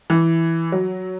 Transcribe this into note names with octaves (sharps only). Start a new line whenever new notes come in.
E3
F#3